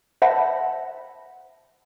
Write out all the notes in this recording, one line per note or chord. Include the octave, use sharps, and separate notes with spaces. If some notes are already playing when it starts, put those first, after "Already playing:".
C5 E5 F#5 A5 B5 A#6